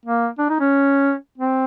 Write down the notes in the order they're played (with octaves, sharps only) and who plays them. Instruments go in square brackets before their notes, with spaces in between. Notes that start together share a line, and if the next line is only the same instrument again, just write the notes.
[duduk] A#3
D4
D#4
C#4
C4